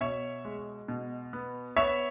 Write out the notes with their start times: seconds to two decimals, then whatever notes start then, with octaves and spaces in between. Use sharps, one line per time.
0.01 B2 C#5 E5
0.45 G#3
0.88 B2
1.33 B3
1.76 B3 C#5 E5